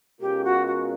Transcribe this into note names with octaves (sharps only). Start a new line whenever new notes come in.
B2 G#3 C#4 F4 G4 A#4
F#4
F#4